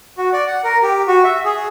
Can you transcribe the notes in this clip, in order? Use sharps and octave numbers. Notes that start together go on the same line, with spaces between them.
F#4
D5
F#5
A#4
G4
F#4
E5
G#4